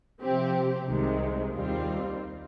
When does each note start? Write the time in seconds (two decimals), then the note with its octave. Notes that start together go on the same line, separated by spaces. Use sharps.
0.21 C3 F3 C4 G4
0.88 C2 C3 D#3 G#3 C4
1.54 D#2 D#3 G3 C4 F4